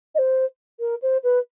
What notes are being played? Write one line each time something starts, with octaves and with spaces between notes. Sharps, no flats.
D#5
C5
A#4
C5
B4